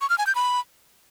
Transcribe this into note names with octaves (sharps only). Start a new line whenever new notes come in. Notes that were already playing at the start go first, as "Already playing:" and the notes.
C#6
F6
G#5
G6
B5